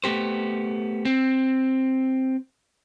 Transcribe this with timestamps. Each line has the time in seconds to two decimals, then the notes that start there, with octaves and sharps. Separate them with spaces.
0.04 A3 B3 G4 C5
1.05 C4